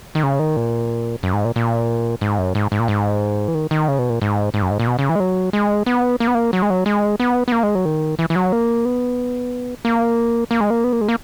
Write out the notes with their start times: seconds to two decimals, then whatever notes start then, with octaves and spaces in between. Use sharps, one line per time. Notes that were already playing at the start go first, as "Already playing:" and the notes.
0.15 D#3
0.23 C#3
0.39 D#3
0.57 A#2
1.23 F#2
1.33 G#2
1.45 A#2
1.56 A#2
2.21 G#2
2.39 F#2
2.55 G#2
2.72 G#2
2.79 A#2
2.88 G#2
3.48 E3
3.54 D#3
3.71 D#3
3.88 C#3
3.98 B2
4.09 A#2
4.21 G#2
4.54 G#2
4.62 F#2
4.71 G#2
4.80 A#2
4.87 B2
4.99 C#3
5.09 E3
5.16 G#3
5.20 F#3
5.53 G#3
5.86 B3
6.20 A#3
6.27 B3
6.35 A#3
6.53 F#3
6.62 G#3
6.70 F#3
6.86 G#3
7.20 B3
7.48 B3
7.52 A#3
7.63 G#3
7.75 F#3
7.85 D#3
8.19 E3
8.30 E3
8.36 F#3
8.52 A#3
8.85 B3
9.85 A#3
10.51 A#3
10.61 G#3
10.70 A#3
10.84 B3
10.93 A#3
11.01 G#3
11.09 A#3